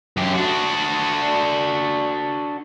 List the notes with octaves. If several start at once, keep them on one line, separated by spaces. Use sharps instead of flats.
F#2 G4
D4 F#4